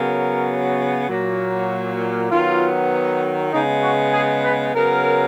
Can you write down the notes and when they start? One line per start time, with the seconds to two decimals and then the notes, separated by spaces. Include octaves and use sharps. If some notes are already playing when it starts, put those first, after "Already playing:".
Already playing: C#3 F#3 B3 A#4
1.09 A#2 F#3 A#3
2.30 D#3 F#3 B3 F4
3.53 C#3 G#3 B3 D#4
3.83 F#4
4.13 G#4
4.44 B4
4.75 C#3 F#3 B3 A#4